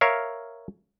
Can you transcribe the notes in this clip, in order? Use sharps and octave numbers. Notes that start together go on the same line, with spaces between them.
A#4 C#5 E5 F5